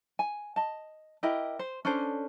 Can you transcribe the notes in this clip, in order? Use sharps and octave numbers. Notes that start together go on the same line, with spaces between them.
G#5
D#5 A5
E4 G4 A#4 D#5
C5
C#4 D4 A4 C5